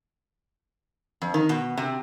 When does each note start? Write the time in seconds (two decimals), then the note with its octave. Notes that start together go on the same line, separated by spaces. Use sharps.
1.22 F2
1.34 D#3
1.49 B2
1.77 C3